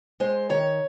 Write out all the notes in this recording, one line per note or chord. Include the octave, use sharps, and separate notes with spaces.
G#3 C5
D#3 C#5